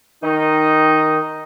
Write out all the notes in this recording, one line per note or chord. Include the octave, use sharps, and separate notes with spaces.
D#3 D#4